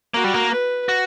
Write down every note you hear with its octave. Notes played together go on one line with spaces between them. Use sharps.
A#3 F#4
G3
A#3
B4
F#4